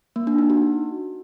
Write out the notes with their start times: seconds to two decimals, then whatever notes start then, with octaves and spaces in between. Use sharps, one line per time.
0.16 A#3
0.27 D4
0.38 D#4
0.50 F#4